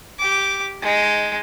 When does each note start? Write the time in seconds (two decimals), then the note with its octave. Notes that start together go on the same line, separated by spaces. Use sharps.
0.19 G4 D6
0.82 G#3 D#4